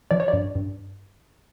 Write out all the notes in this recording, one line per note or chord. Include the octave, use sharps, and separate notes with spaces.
F3 D5
C#5
D5
G2
G2